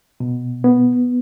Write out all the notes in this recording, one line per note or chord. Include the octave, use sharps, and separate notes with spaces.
B2
B3